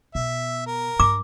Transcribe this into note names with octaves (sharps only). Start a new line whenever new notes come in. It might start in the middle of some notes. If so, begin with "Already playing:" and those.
B2 E5
A#4
G2 D6